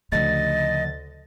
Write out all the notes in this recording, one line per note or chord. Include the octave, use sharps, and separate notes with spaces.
D2 C#3 F3 D#5 A6